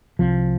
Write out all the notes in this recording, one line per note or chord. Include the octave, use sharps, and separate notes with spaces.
C2 C3 F3